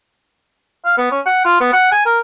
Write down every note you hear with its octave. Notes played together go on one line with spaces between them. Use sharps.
F5
B3
C#4
F#5
F4
B3
F#5
G#5
A#4